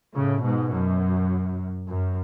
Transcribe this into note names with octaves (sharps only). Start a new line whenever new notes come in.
A2 C#3
G#2 B2
F#2
F#2